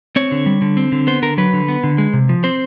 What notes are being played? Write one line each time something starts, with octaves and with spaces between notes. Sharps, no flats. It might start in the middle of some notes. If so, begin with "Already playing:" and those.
C4 C#5
D3
G3
D3
C4
D3
B3 C5
D3 A#4
F#3 B4
D3
B3
D3
G#3
C3
F3
C4 C5